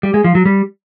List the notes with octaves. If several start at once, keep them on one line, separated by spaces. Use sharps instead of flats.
G3
G#3
F3
F#3
G3